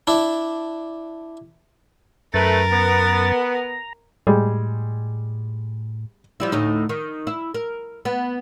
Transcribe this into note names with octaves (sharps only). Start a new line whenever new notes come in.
D4 E4
F#2 A3 A#4 B4 A6
B3
A#5
A2 G3 G#3
F3 G3 E4
D2 A2 D#4
D#3
E4
A#4
B3